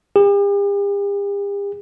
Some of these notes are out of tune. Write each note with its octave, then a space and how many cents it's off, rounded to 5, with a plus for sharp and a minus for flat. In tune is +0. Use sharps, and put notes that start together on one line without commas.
G4 +45